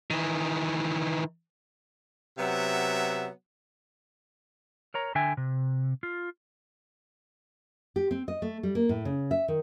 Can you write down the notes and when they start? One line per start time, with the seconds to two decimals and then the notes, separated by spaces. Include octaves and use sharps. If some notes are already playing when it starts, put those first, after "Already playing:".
0.10 D#3 E3
2.38 C3 F#3 B3 E5
4.94 A#4 C#5 A#5
5.15 D3 E5 G5 G#5
5.37 C3
6.03 F4
7.96 G4
8.11 C4
8.28 D#5
8.42 A3
8.63 G3
8.75 A#3
8.89 A2
9.05 C#3
9.31 E5
9.48 D#3